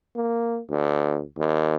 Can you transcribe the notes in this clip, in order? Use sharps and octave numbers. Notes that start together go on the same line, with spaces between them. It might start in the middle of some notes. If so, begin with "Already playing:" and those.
A#3
D2
D#2